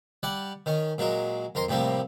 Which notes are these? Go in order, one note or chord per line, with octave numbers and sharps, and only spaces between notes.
G3 D5 F#5
D#3 C#4
A#2 F#3 G#3 A#4
F2 A#4 A#5 C6
A2 C3 F3 G3 A#3